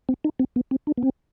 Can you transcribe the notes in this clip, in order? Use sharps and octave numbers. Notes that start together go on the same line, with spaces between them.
C4
D#4
C4
B3
C4
D4
B3
C4